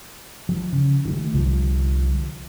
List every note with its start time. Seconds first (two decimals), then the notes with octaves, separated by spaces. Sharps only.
0.49 F3
0.73 C#3
1.05 D#3 F#3 A3
1.34 C2 D3 F3 G3